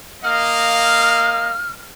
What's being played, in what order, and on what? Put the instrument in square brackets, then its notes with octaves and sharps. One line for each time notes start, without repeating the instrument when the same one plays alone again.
[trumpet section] A#3 D#5 F5 [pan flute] F6